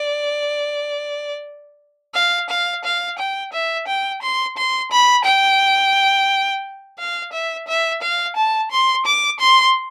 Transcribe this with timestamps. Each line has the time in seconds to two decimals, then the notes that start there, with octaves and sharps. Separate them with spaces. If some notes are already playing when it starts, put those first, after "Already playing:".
Already playing: D5
2.14 F5
2.50 F5
2.85 F5
3.19 G5
3.53 E5
3.88 G5
4.22 C6
4.57 C6
4.91 B5
5.26 G5
6.99 F5
7.33 E5
7.68 E5
8.02 F5
8.36 A5
8.71 C6
9.06 D6
9.40 C6